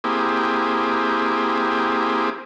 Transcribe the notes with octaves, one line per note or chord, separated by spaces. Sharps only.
A#3 C4 E4 G4 G#4